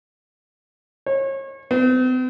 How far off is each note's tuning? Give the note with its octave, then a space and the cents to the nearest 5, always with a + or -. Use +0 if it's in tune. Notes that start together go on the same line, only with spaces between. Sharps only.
C#5 -35
C4 -45